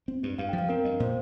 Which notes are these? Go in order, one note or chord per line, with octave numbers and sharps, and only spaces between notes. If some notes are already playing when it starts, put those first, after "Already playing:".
C4
G2
G2 F5
G5
F3
F5
C4 A#4
G2 D#5
A#2 C5